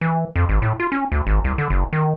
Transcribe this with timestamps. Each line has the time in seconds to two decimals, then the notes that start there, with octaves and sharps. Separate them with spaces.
0.01 E3
0.36 F2
0.49 G#1
0.62 A2
0.80 F4
0.92 C#4
1.12 D2
1.27 G#1
1.44 C2
1.58 D3
1.70 F#1
1.93 D#3